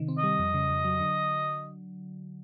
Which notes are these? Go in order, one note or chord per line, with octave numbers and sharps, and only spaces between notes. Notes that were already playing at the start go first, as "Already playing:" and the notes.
Already playing: C3 D#3
C4
G3 D#5
F2
C#3
F2
F#3
D3